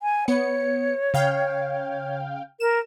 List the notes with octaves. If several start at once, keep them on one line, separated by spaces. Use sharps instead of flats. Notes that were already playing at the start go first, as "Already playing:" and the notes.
G#5
B3 C#5 C#7
C#3 F5 G5
A#4 E7